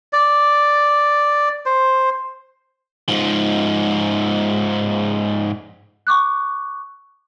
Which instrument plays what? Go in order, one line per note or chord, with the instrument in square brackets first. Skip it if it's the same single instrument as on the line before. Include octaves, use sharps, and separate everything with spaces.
[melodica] D5
C5
[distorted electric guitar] G#2 F3
[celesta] C#6 D6 F#6